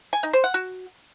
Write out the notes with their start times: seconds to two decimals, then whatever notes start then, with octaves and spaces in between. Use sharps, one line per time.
0.13 G#5
0.23 D#4
0.33 C5
0.44 F#5
0.54 F#4